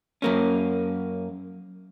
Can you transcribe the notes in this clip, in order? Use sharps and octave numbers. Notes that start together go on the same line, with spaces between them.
F#2 A#3 C#4